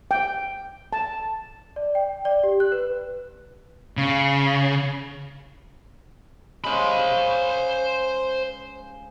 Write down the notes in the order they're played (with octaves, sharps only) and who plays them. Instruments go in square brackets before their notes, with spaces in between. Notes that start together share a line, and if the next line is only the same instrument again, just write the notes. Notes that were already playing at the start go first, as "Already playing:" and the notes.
[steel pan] G5
A5
[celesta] D5
G5
D5
G4
F#6
B4
[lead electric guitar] C#3
[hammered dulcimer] G#3 C#4 F5 [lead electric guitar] C5 B5